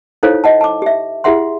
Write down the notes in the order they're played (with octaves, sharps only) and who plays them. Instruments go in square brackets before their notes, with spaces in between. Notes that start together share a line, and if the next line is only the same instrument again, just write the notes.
[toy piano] D#4 E4 A4 C5 C#5 F5
D#5 F#5 A5
A5 D6
G4 E5
E4 G4 G#4 E5 F#5 C6